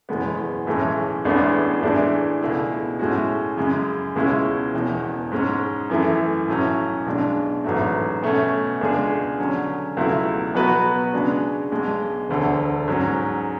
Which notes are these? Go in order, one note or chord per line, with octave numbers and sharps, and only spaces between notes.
F#1 E2 B2 G#3 B3
B1 A2 E3 G#3 C#4
A1 A2 G#3 B3 D4
A2 E3 G#3 D4
C#2 B2 A3 E4 G#4
A2 G#3 C#4 F#4
F#2 C#3 G#3
C#2 B2 G#3 C#4 E4
E1 E2 B2
G#2 G#3 C#4
F#2 E3 A3
B1 A2 F#3 C#4
B1 B2 G#3 D4
A1 G#2 F#3 A3
B2 A3 C#4
C#2 B2 G#3 D4 G#4
D3 F#3 C#4
C#2 B2 F#3 A3 E4
B2 F#3 B3 F#4 B4
C#3 G#3 D4 F#4
B1 B2 G#3
E1 D2 D3
G#2 F#3 C#4